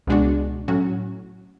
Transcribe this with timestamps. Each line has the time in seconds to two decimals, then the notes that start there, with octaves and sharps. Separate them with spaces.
0.07 C#2 B2 G#3 D4 F#4
0.68 A2 F#3 C#4 F#4